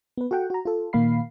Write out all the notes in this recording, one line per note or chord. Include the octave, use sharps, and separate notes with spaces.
B3 B4
F#4 A4 F#5 G5
F#4 A#5
F4 A4
A#2 D#3 A#3 F5 B5 C7